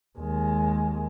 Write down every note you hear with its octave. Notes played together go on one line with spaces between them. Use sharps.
D#2 G#3